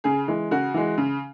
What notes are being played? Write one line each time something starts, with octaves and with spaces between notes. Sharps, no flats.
C#3 G#4
E3 G#3
C#3 F#4
E3 G#3
C#3